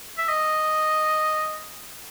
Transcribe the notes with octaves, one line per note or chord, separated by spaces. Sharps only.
E5
D#5